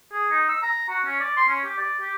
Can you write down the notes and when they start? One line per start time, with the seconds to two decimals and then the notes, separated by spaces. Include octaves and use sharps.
0.13 G#4
0.31 D#4
0.49 E6
0.62 A#5
0.89 F#4
1.05 C#4
1.20 D5
1.37 C6
1.49 C#4
1.65 G4
1.78 D5
2.01 G4